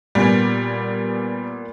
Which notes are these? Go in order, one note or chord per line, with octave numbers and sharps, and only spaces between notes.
A#2 G3 B3 G#5